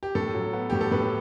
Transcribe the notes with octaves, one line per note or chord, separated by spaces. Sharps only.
G4
A2 A4
F#3
B3
A2 G4
A4
A2 B4